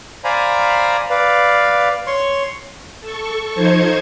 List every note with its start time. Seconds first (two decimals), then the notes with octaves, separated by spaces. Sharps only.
0.24 C5 D5 F5 G#5 A#5 B5
1.10 B4 D5 F5
2.07 C#5 C6 C#6
3.01 A4 C#6
3.55 F3 D#4 C5 C#6 G#6